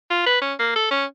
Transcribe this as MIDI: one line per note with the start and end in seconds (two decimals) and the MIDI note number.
0.10 0.25 65
0.26 0.41 71
0.41 0.53 61
0.59 0.75 58
0.76 0.88 69
0.91 1.05 61